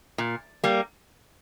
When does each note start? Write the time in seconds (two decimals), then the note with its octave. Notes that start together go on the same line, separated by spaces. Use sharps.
0.18 A#2
0.64 G3 A#3